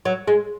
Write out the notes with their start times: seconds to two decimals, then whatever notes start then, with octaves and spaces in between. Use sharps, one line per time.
0.05 F#3
0.28 G#3